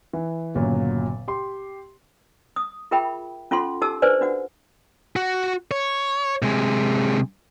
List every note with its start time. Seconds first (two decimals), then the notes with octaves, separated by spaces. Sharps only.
0.13 E3
0.55 G1 A#2 C#3 F#3
1.28 G4 C6
2.56 D#6
2.91 F4 G#4 A#4 E5 G5 B5
3.51 C#4 F4 A4 F#5 C6
3.81 D#4 G4 A4 A5 E6
4.02 D4 G#4 B4 C5 D5 G#5
4.21 D4 F#4 F#5
5.16 F#4
5.71 C#5
6.42 C3 G#3